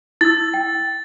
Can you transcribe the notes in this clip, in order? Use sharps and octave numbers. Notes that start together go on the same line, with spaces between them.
E4 E6 A6
G5